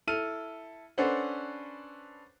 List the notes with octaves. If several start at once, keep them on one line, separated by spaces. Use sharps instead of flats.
E4 A4 F6 D#7
C#4 D4 A4 B4 C5 F#5